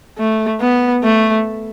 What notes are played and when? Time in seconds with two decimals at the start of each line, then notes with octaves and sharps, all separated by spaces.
0.19 A3
0.61 B3
1.04 A3